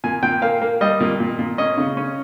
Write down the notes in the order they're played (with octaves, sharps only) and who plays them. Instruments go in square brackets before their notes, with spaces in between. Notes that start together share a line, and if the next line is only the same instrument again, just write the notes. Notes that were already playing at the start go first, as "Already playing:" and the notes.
[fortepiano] A#2 G#5
A#2 G5
A#3 F5
A#3
G3 D#5
A#2
A#2
A#2
C#4 D#5
C#3
C#4